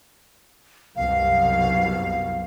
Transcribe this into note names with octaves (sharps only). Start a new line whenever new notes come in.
C2 F#2 B2 F5